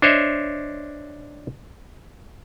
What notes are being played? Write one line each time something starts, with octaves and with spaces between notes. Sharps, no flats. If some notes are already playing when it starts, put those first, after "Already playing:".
D4 C5 C#5 D#5 E5